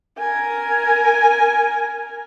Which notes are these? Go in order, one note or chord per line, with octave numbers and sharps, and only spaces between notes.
A#4 G#5